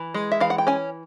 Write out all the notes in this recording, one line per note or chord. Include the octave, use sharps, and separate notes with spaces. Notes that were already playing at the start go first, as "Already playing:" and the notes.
Already playing: E3
G#3
E5
E3 F5
F#5
G5
C#4 G#5